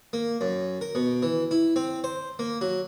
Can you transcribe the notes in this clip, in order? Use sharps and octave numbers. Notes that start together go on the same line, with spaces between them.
A#3
F#2
A#4
B2
E3
E4
C4
C5
A#3
F#3